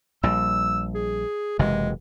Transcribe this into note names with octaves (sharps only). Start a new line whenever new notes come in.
A#1 A#2 G3 E6
G#4
F#1 C3 E3 G#3